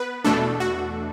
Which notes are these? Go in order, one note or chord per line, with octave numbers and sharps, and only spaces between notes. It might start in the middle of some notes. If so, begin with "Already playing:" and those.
Already playing: B3 B4
E2 B2 A3 D4 A4
F#4